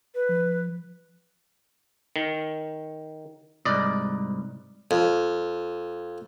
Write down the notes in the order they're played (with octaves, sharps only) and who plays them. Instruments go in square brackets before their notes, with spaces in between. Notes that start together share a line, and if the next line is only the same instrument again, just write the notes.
[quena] B4
[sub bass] F3
[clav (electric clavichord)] D#3
[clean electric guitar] C2 G#2 [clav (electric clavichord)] D5 D#5
[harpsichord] F2